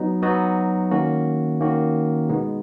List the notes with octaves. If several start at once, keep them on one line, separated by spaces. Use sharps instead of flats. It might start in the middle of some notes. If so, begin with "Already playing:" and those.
Already playing: F#3 B3 D#4 F#4
F#3 B3 D#4 F#4
D#3 A#3 C#4 F#4
D#3 A#3 C#4 F#4
B2 G#3 B3 D#4